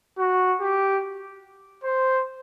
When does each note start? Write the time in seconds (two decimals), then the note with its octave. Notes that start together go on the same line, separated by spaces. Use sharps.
0.18 F#4
0.60 G4
1.84 C5